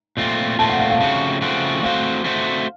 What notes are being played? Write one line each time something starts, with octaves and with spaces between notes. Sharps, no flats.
A#2 A3 C4 F4
A#2 A3 C4 F4 A5
F#5
F5
F5
C#3 F3 A3 C4 F#4
C#3 F3 A3 C4 F#4
A3 C4 F#4 C5 F5
A3 C4 F#4 C5